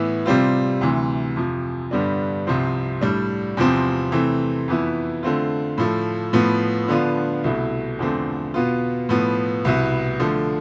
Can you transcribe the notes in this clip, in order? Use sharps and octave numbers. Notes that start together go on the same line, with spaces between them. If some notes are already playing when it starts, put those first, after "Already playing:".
Already playing: A2 E3 B3 E4
C3 G3 C4 F4
D2 C3 E3
F2 C3 F3
G2 D3 G3 B3 D4
C2 C3 F3 C4
A2 G3 D4
E2 C3 F3 C4
C3 E3 A3 C4
F2 E3 B3 E4
D3 A3 C4 F4
A2 F3 A3
A2 F3 B3
D3 F3 B3 D4 F4
C2 B2 A3 E4
E2 D3 F3 A3 C4
B2 B3 F4
A2 F3 B3
C2 B2 B3 E4
D3 F3 A3